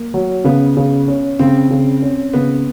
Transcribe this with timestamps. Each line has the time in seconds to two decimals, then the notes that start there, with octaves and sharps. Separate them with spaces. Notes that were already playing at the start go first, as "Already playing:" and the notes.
Already playing: A#3
0.14 F#3
0.44 C#3 B3
0.77 C#3
1.08 C#4
1.39 C#3 C4
1.71 C#3
2.02 C#4
2.34 C#3 B3